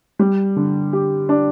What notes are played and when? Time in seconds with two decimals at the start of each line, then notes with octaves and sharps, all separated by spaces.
0.19 G3
0.56 D3
0.93 G4
1.29 D4